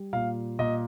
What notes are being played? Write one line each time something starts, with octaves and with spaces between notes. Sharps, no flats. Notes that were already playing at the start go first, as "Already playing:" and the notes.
Already playing: G3
A#2 F5
A#2 D#5